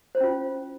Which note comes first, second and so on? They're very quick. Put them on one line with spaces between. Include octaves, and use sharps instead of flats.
C5 E4 C#4 F4